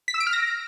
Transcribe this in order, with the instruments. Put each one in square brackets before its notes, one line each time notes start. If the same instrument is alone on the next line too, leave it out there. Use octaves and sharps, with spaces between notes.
[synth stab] B6
E6
D7
F6
A#6